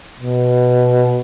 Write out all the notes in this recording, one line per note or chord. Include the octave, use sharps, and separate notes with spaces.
B2